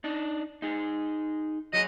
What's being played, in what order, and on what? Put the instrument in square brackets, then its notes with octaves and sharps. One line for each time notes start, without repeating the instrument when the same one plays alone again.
[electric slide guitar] D4 D#4
D#4 G#4
[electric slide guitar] F#3 F#4 G#4 [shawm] D#5